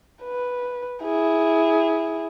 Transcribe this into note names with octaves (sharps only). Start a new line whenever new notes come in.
B4
E4 G#4